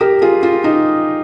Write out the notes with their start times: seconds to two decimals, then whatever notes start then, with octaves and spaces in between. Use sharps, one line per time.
0.01 G4 A#4
0.22 F4 G#4
0.43 F4
0.64 D#4